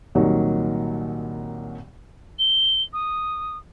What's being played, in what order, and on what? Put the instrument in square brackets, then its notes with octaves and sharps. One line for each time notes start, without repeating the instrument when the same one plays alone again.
[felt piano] C2 A#2 D#3 F#3
[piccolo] G7
D#6